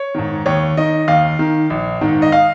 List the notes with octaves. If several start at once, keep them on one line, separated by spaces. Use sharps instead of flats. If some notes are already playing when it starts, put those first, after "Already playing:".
Already playing: C#5
G#2 D#3
D#2 C#5
D#3 D#5
D#2 F5
D#3
A#1
G#2 D#3
D#5
F5